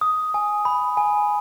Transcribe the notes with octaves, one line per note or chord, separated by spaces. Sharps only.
D#6
G#5
B5
G#5